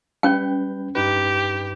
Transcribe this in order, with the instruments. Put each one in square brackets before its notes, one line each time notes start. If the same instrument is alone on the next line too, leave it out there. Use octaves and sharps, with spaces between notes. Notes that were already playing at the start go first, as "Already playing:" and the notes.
[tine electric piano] G3 B4 G6 [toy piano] C#4 G5
[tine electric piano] G2 D#4 B4 [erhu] G4